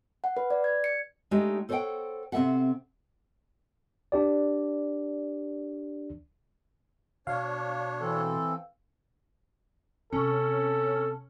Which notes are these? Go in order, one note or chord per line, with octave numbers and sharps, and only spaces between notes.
F#5
B4
D5
G#6
C#7
G#3 A3 D4 D#4 G4
A4 C5 C#5 D#5 F#5 G5
C3 C4 F#4 A4 E5 F#5
D4 G4 D5
B2 D4 C#5 F5
E3 C4 A4
C3 C#4 A4